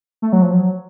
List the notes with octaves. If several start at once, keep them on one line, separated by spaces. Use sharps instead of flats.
A3
F#3
F3
F#3